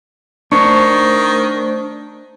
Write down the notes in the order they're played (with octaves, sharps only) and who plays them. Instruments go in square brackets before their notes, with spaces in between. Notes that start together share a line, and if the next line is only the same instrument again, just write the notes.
[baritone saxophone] D#3 [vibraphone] A3 C5 [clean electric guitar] D4 [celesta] C#6